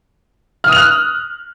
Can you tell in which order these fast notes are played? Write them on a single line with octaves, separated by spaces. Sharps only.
F6 D#6 F7 F#6